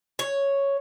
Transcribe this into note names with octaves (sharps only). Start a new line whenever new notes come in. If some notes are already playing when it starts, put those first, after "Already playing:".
C#5